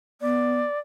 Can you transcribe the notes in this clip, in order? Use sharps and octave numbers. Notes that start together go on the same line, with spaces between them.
B3 D5